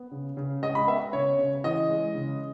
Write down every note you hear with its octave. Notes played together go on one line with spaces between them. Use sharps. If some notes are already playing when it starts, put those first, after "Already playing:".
Already playing: B3
C#3
C#3
G#3 D#5
B5
B3 E5
C#3 C#5
C#3
E3 D#5
G#3
C#3